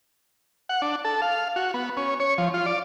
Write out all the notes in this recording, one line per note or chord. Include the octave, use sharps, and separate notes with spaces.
F#5
D4
A4
F5
F#4
B3
C#4
C#5
F3
F4
D5